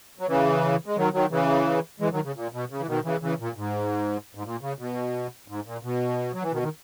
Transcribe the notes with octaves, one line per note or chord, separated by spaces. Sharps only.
F#3
C#3 E3
G#3
D#3 F#3
D#3 F#3
C#3 E3
E3 G#3
D#3 F#3
C#3
A#2
B2
C#3
E3
B2 D#3
C#3 E3
C#3 E3
A#2
G#2
G#2
A#2
C#3
B2
G#2
A#2
B2
F#3
E3
B2 D#3
D#3